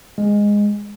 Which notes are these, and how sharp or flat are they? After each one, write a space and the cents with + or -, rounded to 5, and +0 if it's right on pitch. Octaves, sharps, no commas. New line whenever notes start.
G#3 -10